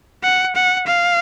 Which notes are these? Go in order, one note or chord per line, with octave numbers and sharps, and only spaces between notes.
F#5
F#5
F5